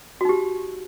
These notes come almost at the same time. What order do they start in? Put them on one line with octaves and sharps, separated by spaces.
F#4 D#4 G4